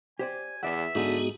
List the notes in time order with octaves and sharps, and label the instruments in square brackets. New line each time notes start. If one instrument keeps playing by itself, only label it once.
[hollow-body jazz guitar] G4 C5 D5 [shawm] G#5
[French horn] E2 [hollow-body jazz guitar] D5 F#5 [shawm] E5
[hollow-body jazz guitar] G#2 D#4 [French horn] D3 [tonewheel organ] B3 F#4 G#4